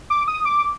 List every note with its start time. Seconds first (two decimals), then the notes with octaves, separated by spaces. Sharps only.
0.10 D6
0.28 D#6
0.45 D6